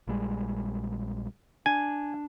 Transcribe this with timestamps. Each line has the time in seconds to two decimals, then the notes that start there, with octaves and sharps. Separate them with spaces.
0.07 A#1 G3 G#3
1.66 D4 G#5